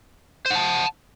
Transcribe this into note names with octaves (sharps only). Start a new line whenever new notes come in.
C5 F#5 A5